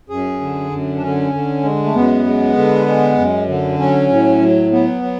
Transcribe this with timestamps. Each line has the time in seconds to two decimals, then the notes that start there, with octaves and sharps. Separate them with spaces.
0.09 F#2 G#4
0.41 D3
0.71 F#2
0.97 D4
1.02 D3 C#4
1.33 D3
1.63 G#3
1.84 A3
1.94 F#2 B3
2.25 G#3
2.56 D3
2.86 G#3
3.17 F#2
3.48 D3
3.78 F#3 C#4
4.10 A2
4.41 F#3
4.71 F#3 B3
5.02 F#3